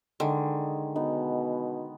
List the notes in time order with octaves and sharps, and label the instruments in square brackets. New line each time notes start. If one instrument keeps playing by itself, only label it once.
[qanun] D3 [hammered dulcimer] D#3 G#3
[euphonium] B2 [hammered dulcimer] B3 [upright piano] D#4